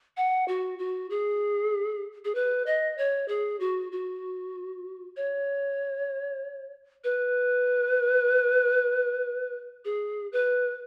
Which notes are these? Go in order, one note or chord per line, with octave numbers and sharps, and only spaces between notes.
F#5
F#4
F#4
G#4
G#4
B4
D#5
C#5
G#4
F#4
F#4
C#5
B4
G#4
B4